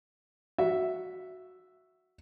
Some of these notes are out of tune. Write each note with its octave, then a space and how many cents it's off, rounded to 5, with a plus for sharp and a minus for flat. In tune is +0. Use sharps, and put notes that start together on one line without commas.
F#4 -5 E5 +0